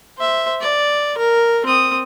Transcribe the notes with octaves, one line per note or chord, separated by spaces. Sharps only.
C5 E5
D5
A#4
C4 D#6